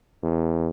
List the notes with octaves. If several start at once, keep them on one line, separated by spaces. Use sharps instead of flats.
E2